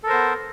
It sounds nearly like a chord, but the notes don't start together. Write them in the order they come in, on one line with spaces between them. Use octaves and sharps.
A4 A#4 C5 B3